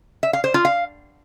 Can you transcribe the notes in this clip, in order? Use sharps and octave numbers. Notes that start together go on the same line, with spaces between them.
E5
F5
C5
F4
F5